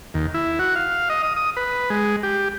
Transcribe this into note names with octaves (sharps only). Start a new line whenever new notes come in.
D#2
E4
F#4
F5
D#5
D#6
D#6
B4
G#3
G4